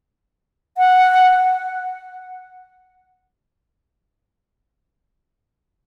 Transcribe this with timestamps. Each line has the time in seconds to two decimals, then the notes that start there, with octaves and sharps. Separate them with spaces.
0.78 F#5